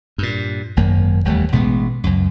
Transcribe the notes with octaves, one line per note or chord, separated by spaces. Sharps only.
G2 A#2
G#1 F#2 A#3
E1 D#2 G3 A3
A1 B2 G#3 B3
C#2 F#2